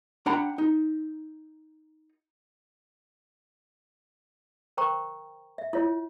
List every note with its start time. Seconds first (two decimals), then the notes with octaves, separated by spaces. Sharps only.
0.26 D4 F#5 G5 A#5 B5
0.58 D#4
4.77 A#4 C5 G5 A#5 C#6
5.58 E5
5.73 E4 F4 C#5